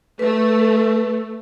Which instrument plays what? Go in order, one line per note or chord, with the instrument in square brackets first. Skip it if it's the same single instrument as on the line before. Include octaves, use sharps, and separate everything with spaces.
[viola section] A3 [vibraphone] B4